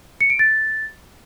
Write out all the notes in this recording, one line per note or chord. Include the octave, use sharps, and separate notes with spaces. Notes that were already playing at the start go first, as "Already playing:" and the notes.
C#7
D7
A6